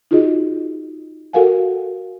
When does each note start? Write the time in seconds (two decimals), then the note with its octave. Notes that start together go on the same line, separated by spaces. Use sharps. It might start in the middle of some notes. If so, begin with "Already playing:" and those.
0.11 D#4 F4 F#4 G#4 D#5
1.33 F#4 A4 A#4 F5 F#5 G#5